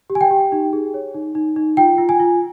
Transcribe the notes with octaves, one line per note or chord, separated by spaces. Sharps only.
G4
G#5
G5
G4
D#4
G#4
C#5
D#4
D#4
D#4
F4 G5
F4
G#5
F4